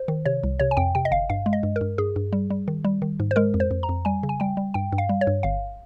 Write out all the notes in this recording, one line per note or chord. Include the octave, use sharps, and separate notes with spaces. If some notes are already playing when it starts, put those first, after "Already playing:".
Already playing: C5
D#3
C3 C#5
C2
C3 C#5
G#5
F2 G5
C3 G5
D#5
G1 F5
G2 F5
G#3
D#5
G2
A#4
G2
G2 G#4
G2
G3
G3
D#3
G3
D#3
G#2
C5
G#3 A#4
F2
C5
F2
A#5
F2
G3 G#5
C#3
G#5
G3 G5
G3
G2 G5
G2
F5
G3
C#5
G2
G1 F5